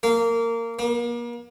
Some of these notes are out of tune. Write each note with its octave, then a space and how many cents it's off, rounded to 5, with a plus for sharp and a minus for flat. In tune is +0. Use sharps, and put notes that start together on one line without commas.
A#3 -20
A#3 +35